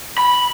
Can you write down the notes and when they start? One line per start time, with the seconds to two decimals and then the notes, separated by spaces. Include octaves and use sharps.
0.18 B5